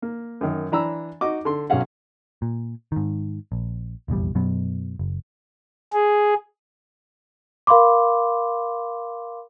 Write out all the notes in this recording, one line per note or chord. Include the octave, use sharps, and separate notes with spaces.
A#3
F#2 D#3
E3 D4 A#5 B5 E6
D#4 F#4 D#5 D6
D3 C6
B1 F#3 C#4 F5 F#5
A#2
G#2 D#3
A#1
F1 A#1 E2 G3
F#2 B2 F#3 B3
F#1
G#4
A#4 F5 B5 C6 D6